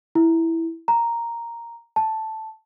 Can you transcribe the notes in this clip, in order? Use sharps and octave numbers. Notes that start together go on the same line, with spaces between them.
E4
A#5
A5